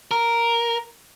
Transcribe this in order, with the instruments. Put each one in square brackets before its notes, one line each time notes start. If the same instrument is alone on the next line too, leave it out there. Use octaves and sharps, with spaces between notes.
[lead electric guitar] A#4